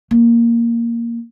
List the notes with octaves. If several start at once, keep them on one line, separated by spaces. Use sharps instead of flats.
A#3